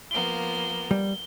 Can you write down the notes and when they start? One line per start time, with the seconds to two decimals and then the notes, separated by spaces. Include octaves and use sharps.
0.11 F3 A#3 B3 G7
0.91 G3